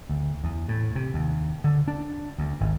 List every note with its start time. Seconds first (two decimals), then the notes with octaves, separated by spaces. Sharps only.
0.10 D2
0.44 E2
0.68 A2
0.95 C3
1.14 D#2
1.64 D3
1.88 D4
2.38 D2
2.61 G#1